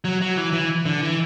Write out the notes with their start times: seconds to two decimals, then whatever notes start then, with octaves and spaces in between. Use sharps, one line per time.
0.04 F#3
0.21 F#3
0.38 E3
0.53 E3
0.85 D3
1.02 E3